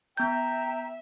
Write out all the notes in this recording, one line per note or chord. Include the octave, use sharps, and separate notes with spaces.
B3 E5 G5 A#5 G6